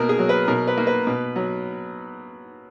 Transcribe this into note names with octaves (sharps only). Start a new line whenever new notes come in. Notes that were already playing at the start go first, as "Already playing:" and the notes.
Already playing: B2 A#3 A#4
G#4
F#3
B4
B2 A#4
B4
A#3
B4
B2
F#3